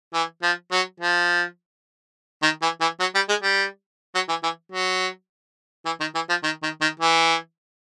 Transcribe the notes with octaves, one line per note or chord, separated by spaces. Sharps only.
E3
F3
F#3
F3
D#3
E3
E3
F#3
G3
G#3
G3
F#3
E3
E3
F#3
E3
D#3
E3
F3
D#3
D#3
D#3
E3